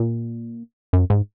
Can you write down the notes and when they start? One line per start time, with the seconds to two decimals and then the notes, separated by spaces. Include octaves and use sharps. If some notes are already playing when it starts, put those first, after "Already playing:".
Already playing: A#2
0.93 F#2
1.10 G#2